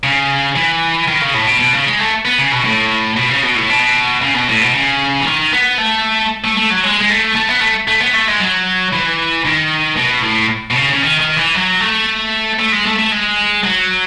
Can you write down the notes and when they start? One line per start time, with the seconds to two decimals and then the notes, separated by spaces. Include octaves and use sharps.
0.03 C#3
0.56 E3
1.07 D#3
1.21 C#3
1.34 A2
1.47 B2
1.60 B2
1.73 C#3
1.86 G#3
1.99 A3
2.25 B3
2.38 C#3
2.52 B2
2.64 A2
3.17 B2
3.30 C#3
3.43 B2
3.56 A2
3.70 B2
4.22 C#3
4.34 B2
4.48 A2
4.61 B2
4.74 C#3
5.20 E3
5.26 D#3
5.53 B3
5.78 A3
6.44 A3
6.57 A3
6.70 F#3
6.84 G#3
7.01 G#3
7.09 A3
7.35 A3
7.49 B3
7.61 A3
7.88 A3
8.01 B3
8.14 A3
8.28 G#3
8.40 F#3
8.93 E3
9.45 D#3
9.97 B2
10.23 A2
10.71 B2
10.75 C#3
10.93 C#3
11.02 D#3
11.20 D#3
11.37 E3
11.55 F#3
11.81 A3
12.59 A3
12.72 G#3
12.85 A3
12.98 A3
13.12 G#3
13.64 F#3